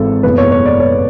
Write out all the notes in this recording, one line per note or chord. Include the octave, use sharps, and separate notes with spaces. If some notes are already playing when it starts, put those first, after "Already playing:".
Already playing: G#1 G#2 E3 A4
F#1 E2 B2 B4
C#5
C#5
D5
C#5